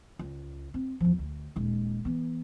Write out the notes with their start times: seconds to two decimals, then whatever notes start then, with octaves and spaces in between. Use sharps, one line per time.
0.19 C#2
0.74 C4
1.00 E2 F3
1.19 D2
1.56 D#1 G#3
2.05 E3 B3